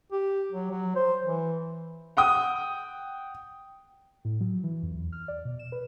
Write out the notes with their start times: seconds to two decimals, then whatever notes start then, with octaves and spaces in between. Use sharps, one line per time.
0.12 G4
0.52 F#3
0.71 F#3
0.96 C5
1.25 E3
2.17 F#5 G5 D#6
4.25 A2
4.41 F#3
4.64 E3
4.83 F2
4.94 E2
5.12 F6
5.28 D5
5.45 B2
5.59 E7
5.72 B4